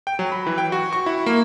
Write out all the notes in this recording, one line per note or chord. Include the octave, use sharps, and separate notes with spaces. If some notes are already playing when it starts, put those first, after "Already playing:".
G5
F#3
B5
E3
G5
F#4
C#6
E4
A#3